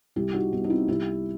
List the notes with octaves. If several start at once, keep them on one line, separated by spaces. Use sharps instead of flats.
C2 E4 G4
D#4 F#4
C2 B3 D#4
D#4
C4 E4
C2 E4 G4